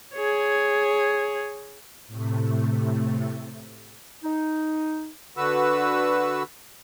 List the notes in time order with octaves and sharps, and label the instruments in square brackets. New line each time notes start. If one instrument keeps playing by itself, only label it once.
[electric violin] G#4 C#5
[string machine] A2 C3 A3
[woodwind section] D#4
[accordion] D3 F#4 B4 E6